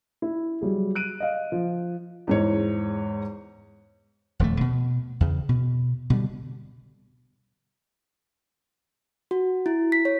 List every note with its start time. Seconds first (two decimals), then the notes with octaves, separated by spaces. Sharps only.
0.22 E4
0.61 F#3 G3 G#4
0.95 F#6 D7 D#7
1.20 D#5 F5
1.52 F3
2.27 E2 G#2 C#5
4.39 D#1 F2 G#3 A3
4.61 B2
5.20 E2 C#3
5.49 B2
6.10 B2 D3 G3
9.31 F#4
9.66 E4
9.92 B6
10.05 C#5